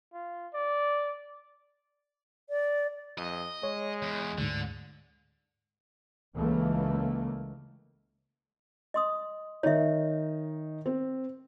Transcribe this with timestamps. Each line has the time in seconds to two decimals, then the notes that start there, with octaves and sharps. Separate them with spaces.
0.13 F4
0.54 D5
2.50 D5
3.18 F2 D#5
3.63 G#3 C#5
4.02 E2
4.38 D2 G#2 D3
6.37 C#2 C#3 E3 A3 A#3
8.94 D#5 C6 D#6
9.63 D#3 D#4 C#5 D#5 E5
10.86 C4